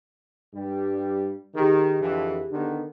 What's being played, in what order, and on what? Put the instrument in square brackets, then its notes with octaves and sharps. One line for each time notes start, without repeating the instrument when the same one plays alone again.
[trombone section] G2 G3
[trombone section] D#3 [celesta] G4 G#4
[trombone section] F2 D3 E3
D3 D#3 B3